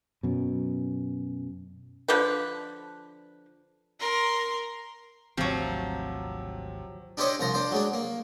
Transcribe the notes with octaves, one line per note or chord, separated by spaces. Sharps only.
F#2 B2
D3 F3 D4 B4
A#4 C6
G#1 D2 C3 F3 F#3
D4 E4 G4 C5 C#5 D#5
C2 F3 A#5 C6
D4 C5
F#3 G#3 D4
A#3